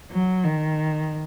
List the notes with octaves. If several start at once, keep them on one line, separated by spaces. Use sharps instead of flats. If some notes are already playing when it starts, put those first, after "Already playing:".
F#3
D#3